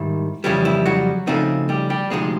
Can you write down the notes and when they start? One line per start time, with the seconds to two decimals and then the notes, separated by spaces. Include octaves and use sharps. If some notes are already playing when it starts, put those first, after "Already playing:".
Already playing: G#2 D#3 G3 E4
0.44 F2 C#3 E3 G3 E4
0.65 E4
0.86 F#3 F#4
1.27 C#3 F3 A3 C4 D#4
1.69 G3 G4
1.90 G3 G4
2.10 D2 C3 F3 G#3 C4 D#4